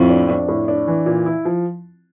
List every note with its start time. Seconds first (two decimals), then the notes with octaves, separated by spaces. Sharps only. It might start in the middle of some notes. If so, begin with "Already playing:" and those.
Already playing: F2 A2
0.10 D4
0.29 D4
0.49 A2
0.68 D4
0.88 E3
1.06 A#2
1.26 E4
1.45 F3